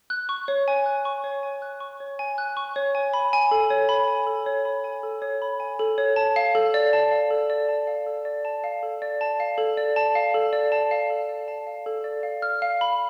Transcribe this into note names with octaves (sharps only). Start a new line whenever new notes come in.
F#6
C#6
C#5
G#5
F#6
C#6
C#5
G#5
F#6
C#6
C#5
G#5
F#6
C#6
C#5
G#5
B5
G#5
A4
C#5
B5
G#5
A4
C#5
B5
G#5
A4
C#5
B5
G#5
A4
C#5
A5
F5
A4
D5
A5
F5
A4
D5
A5
F5
A4
D5
A5
F5
A4
D5
A5
F5
A4
D5
A5
F5
A4
D5
A5
F5
A4
D5
A5
F5
A4
D5
F5
F6
F5
B5